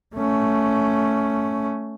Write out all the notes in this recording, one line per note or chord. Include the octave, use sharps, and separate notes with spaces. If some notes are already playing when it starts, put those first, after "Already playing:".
A3 C#4